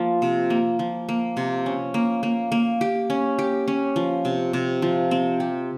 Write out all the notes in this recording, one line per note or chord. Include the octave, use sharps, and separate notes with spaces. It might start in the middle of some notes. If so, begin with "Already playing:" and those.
Already playing: F3 A#3 F4
C3
A#3
F3
A#3
C3
C#4
A#3
A#3
A#3
G4
C#4
G4
C#4
F3
C3
C3
F3
C4
G4